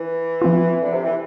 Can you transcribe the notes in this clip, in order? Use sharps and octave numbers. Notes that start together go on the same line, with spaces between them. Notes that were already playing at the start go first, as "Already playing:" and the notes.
Already playing: E3
F3 C4 F4
D3
C3
E3